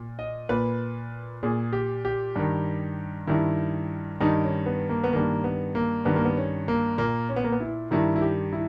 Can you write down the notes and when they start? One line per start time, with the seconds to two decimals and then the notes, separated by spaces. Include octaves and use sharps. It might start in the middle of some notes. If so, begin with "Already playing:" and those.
Already playing: A#2
0.19 D#5
0.49 A#2 B4
1.43 A#2 G#4
1.73 G4
2.05 G4
2.36 G2 D#3
3.27 G2 D#3 E4
4.20 G2 D#3 D#4
4.44 C#4
4.66 B3
4.89 A#3
5.04 B3
5.13 G2 D#3 A#3
5.44 B3
5.75 A#3
6.05 G2 D#3 B3
6.16 A#3
6.25 B3
6.37 C#4
6.68 A#3
6.98 A#2 A#3
7.29 C#4
7.36 B3
7.44 A#3
7.52 B3
7.60 E4
7.91 G2 D#3 E4
8.16 E4
8.21 G4
8.53 E4